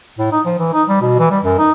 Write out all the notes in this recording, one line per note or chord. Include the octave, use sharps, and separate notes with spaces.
A2
D#4
F3
E3
D#4
G3
B2
E3
G3
F#2
D#4